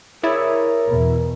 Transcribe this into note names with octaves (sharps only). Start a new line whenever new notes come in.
E4 G#4 A#4 C#5 D5
E2 B2